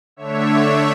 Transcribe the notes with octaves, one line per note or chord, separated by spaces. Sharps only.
D3 A3 D4 C#5 E5